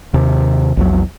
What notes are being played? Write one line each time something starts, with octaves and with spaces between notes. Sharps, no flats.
D#2 C3
A#1 E2 F#3